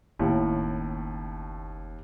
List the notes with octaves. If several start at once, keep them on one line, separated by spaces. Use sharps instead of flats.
F#1 D#2 A2 B3 C#4